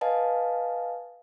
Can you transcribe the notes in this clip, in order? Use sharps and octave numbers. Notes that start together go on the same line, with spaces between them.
B4 D#5 F5 G#5 A5